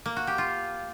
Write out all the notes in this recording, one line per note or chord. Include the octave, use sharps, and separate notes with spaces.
A#3
F#4
G4
F4